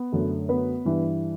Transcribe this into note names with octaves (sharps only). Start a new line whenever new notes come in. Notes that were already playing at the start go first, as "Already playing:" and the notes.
Already playing: B3
F#2 D3 A3
B3 B4
G2 E3 G3